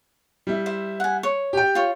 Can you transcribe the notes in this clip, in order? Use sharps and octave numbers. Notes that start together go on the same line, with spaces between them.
G3 E4
C5 E5
F#5 G#5
C#5
G4 G5
F4 C#5